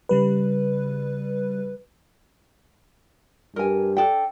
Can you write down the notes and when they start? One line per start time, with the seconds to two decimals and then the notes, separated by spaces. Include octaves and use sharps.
0.09 C#3 G3 B4
3.56 G2 A#4 G#5
3.97 D4 A4 G5